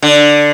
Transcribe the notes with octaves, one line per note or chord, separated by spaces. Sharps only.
D3